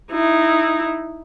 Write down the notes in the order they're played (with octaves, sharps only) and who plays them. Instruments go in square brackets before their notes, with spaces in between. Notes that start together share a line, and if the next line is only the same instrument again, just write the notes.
[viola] D#4 E4